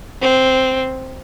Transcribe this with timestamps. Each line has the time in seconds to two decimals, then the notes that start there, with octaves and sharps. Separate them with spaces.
0.21 C4